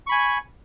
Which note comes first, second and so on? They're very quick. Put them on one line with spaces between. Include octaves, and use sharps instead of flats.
C#6 B5 G#5